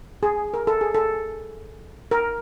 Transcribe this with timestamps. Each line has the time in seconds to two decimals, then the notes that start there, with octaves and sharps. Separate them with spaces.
0.23 G#4
0.54 A#4
0.67 A4
0.81 G#4
0.95 A4
2.11 A#4